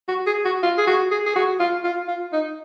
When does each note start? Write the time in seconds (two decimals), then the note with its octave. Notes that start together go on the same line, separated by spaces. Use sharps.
0.08 F#4
0.27 G#4
0.45 F#4
0.63 F4
0.78 G#4
0.87 F#4
1.11 G#4
1.26 G#4
1.35 F#4
1.60 F4
1.84 F4
2.08 F4
2.33 D#4